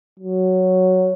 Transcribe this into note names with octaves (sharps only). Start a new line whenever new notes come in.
F#3